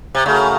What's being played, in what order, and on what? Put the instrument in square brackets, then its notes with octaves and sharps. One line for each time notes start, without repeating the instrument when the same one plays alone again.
[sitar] C3
[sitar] C#3 [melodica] A3 C#4 F#4 A#4